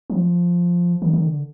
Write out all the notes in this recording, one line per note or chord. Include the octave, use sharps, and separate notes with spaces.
F3
D#3
D#3
D3